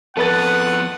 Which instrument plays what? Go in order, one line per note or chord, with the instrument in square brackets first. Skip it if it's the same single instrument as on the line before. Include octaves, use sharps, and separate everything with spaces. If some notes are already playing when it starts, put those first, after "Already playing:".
[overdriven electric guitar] F2 B3 [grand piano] A4 B4 A6 [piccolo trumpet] F#5